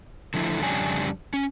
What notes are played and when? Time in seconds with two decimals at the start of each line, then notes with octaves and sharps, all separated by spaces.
0.34 D3 F3 A3 C#4 E4
0.61 F2 C#3 G3 C#4 D4 G#5
1.34 C#4